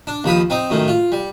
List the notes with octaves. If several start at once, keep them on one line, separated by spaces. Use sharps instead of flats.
D4
D#2 F3 B5 D#6
C4 D#4
F#2 A2 D#3
F4
G3